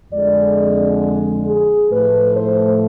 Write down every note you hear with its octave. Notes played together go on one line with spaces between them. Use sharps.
F2 D3 G#3 D5
G#4
A2 F3 A3 B4
C5